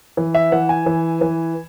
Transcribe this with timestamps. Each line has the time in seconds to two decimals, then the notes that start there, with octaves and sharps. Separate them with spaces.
0.17 E3
0.35 E5
0.52 E3 F#5
0.69 G#5
0.86 E3
1.21 E3